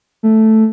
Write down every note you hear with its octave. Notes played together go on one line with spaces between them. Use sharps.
A3